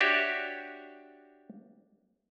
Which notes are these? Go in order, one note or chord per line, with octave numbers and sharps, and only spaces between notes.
D4 F#4 G4 C#5 E5